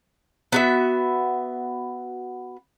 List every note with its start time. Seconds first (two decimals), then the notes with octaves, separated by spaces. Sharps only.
0.52 B3 F#4 E5